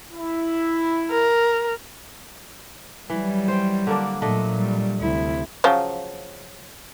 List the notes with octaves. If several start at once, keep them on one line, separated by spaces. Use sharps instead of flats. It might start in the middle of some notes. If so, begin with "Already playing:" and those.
E4
A#4
E3 F#3 G3
C5 G5
D3 A#3 D4
A#2 F#3 A3 D4 D#5
G3
D2 C3 E4
C#3 F3 F#3